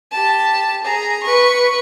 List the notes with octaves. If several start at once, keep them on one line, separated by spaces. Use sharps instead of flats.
G4 A5
G#4 A#5
B4 C#6